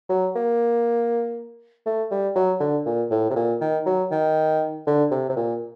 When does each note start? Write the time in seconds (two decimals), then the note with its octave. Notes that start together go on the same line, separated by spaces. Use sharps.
0.09 F#3
0.36 A#3
1.86 A3
2.11 G3
2.36 F#3
2.60 D3
2.86 A#2
3.11 A2
3.30 C3
3.36 A#2
3.61 D#3
3.86 F#3
4.12 D#3
4.87 D3
5.11 C3
5.29 C3
5.36 A#2